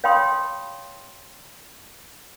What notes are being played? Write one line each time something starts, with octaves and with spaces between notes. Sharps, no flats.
C#5 F5 G5 B5 C6 D#6